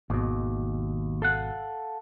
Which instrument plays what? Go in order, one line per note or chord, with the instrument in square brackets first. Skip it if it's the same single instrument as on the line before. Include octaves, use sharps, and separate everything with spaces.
[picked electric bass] G#1 B2 [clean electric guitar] D#2
[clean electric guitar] A4 F5 F#5